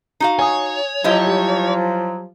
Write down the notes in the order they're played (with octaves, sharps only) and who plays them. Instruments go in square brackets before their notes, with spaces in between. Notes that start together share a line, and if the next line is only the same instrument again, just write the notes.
[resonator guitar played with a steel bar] D#4 F#4 F5
[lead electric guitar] C#5 [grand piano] G#5 D#6
[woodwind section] F3 F#3 [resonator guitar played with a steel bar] E4 G4 D#5
[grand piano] G3